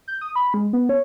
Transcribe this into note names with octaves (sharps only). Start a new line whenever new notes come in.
G6
D#6
B5
G#3
B3
C#5